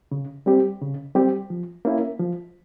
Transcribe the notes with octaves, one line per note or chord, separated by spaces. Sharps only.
C#3
G3 C4 G4
C#3
G3 C4 G4
F3
A#3 C#4 E4
F3